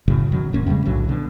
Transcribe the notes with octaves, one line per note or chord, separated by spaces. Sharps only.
F#1 A2 C#3 F#3
B2 D#3 F#3
D#1 G#2 A#3 C#4
E2 C#3 G3 G#3
B1 A2 D3 F#3
B2 D3